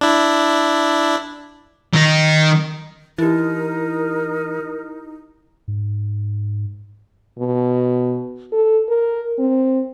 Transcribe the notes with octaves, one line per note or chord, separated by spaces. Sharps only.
D4 E4
D#3 D#4
E3 D#4 E4 G4 A#4
G#2
B2
A4
A#4
C4